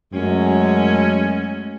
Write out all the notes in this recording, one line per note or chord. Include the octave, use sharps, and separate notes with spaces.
F#2 G#3 A3 C#4